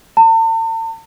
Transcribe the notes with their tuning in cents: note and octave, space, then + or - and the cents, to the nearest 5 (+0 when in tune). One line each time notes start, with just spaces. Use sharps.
A5 +45